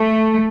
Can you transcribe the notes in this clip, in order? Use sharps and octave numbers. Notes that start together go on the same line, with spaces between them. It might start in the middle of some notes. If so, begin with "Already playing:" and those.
Already playing: A3